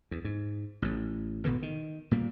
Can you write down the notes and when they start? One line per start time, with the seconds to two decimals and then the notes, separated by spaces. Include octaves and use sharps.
0.11 E2
0.24 G#2
0.82 A1 A2
1.45 G#1 B2 D3 E3
1.62 D#3
2.11 A#2 G3 A#3